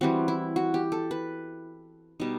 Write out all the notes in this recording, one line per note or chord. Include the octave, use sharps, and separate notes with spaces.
E3 G3 C4 F#4
E4
F#4
G4
A4
B4
B2 G3 D#4 D#5